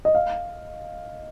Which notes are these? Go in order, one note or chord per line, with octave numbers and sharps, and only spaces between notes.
D#5
F5